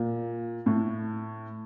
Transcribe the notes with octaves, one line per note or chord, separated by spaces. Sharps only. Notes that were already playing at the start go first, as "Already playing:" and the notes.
Already playing: A#2
A2